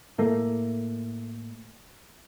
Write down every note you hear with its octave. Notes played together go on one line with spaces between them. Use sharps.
A2 A3 A#3